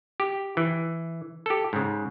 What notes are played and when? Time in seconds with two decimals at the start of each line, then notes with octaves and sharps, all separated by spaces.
0.20 G4
0.57 E3
1.46 G4 A4
1.73 G#2 C#3